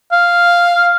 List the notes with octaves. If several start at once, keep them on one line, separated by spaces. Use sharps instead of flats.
F5